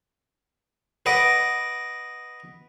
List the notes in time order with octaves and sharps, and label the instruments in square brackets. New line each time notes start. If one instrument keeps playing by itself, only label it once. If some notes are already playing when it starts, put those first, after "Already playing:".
[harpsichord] B4 D#5 F#5 D6